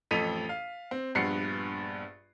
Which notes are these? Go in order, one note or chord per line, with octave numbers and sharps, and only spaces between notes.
A1 F2 A4 B6 D#7 F7
F5
C4
A#1 G2 B3 F#5 C7 C#7